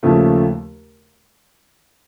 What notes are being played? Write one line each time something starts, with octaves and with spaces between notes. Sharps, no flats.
D#2 C#3 F3 A3